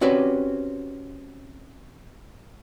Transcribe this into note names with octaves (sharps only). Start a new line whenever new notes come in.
C4 C#4 F#4 G4 B4 D5